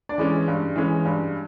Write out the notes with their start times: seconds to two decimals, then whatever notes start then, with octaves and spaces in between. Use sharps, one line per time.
0.09 D4 D5
0.18 E3 G#3 C#4
0.48 G2
0.76 E3 G#3 C#4
1.05 G2